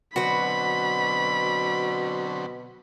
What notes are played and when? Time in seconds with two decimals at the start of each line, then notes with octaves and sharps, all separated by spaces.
0.16 B2 D3 F#3 C4 F#4 B4 B5